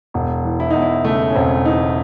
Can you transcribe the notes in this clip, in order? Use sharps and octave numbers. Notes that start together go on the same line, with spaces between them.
E1
E3
E4
E2 D#4
E4
C#3 A3
C#4
E1 C4
E3 D#4